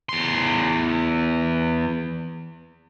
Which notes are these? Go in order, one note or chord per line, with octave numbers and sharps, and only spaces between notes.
E2 C6